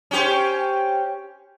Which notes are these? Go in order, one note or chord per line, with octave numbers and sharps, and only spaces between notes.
C#4 G4 C5